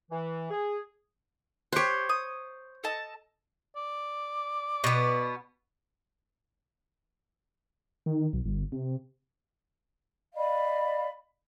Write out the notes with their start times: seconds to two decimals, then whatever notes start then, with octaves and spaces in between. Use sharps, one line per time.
0.11 E3
0.50 G#4
1.73 G4 C5 C#5 F#6
2.09 D#6
2.84 A4 D#5 A5
3.76 D5
4.84 B2 B3
8.06 D#3
8.33 B1
8.45 G1
8.72 C3
10.35 D5 D#5 F5 B5